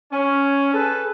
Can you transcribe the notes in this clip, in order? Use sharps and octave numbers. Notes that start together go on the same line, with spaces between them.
C#4
G#4 A4 B4